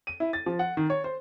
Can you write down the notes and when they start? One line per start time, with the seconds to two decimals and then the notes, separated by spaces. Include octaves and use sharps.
0.07 D#7
0.20 E4
0.33 A6
0.46 F3
0.59 F#5
0.77 D#3
0.90 C#5
1.04 C5